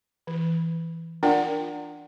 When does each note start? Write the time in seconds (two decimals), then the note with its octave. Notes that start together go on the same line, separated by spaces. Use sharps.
0.27 E3
1.23 D4 F4 A#4 D5 F#5 G5